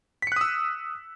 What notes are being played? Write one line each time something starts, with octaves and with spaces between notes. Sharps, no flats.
D#6 E6 F#6 B6 C#7